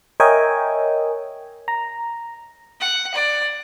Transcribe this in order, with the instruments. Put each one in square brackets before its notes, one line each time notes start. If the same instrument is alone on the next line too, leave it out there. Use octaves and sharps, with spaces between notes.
[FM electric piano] A#4 C#5 D#5 E5 G5 G#5
A#5
[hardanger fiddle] F#5
D5